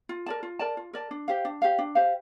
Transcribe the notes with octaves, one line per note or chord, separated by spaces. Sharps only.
F4
A#4 D5 A5
F4
A#4 D5 A5
F4
A#4 D5 A5
D4
G4 C5 F5
D4
G4 C5 F5
D4
G4 C5 F5